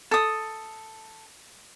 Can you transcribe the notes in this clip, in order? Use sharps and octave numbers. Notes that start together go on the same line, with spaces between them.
A4 D#6